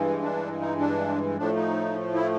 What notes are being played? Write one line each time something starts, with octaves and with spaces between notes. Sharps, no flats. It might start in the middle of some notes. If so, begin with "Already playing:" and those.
Already playing: G2 E3 G#3
D4
D#4
D4
A2 F3 A3 D4
D#4
E4